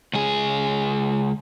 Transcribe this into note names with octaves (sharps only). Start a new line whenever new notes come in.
C#2 G#4